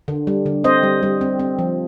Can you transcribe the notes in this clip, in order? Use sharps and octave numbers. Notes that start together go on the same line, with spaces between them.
D3
G3
D3
C4 C5 D#5
G3
G3
C4
C4
F3